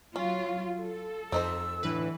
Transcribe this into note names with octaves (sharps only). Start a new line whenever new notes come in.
F#3 C#4 F4
A4
F2 C4 D#4 C5 E6
A2 D3 E3 B4